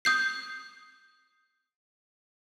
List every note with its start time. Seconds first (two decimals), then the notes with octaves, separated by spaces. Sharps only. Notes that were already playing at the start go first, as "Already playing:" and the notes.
0.05 D#6 G6 C7